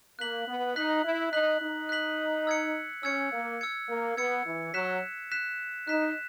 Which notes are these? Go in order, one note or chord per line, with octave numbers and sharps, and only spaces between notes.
A#3 F#6 B6 F#7
B3
D#4 F#6 B6 F#7
E4
D#4 F#6 B6 F#7
D#4
F#6 B6 F#7
E6 G#6 C#7
C#4 E6 G#6 C#7
A#3
E6 G#6 C#7
A#3
B3 E6 G#6 C#7
E3
F#3 F#6 B6 E7
F#6 B6 E7
D#4 F#6 B6 E7